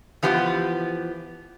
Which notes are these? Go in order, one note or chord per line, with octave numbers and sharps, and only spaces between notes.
E3 F3 B3 G4